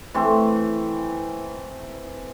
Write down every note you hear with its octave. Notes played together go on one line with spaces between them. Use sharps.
E3 A3 C4